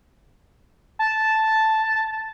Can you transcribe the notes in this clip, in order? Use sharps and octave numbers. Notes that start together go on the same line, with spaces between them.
A5